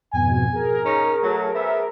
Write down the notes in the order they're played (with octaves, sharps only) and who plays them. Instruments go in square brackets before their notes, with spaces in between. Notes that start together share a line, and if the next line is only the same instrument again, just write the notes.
[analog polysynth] F2 G#2 B2 [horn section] G#5
[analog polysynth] G#4 A#4
[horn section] C#4 D#4 A#5
F#3 A3
B3 C5 E5